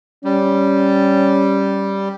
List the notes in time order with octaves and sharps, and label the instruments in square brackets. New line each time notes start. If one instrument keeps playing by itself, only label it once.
[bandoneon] G3 [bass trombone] C#4